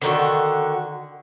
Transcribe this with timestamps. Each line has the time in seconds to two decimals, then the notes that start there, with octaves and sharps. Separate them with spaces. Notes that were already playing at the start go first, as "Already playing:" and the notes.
0.02 D3 D#3 F#4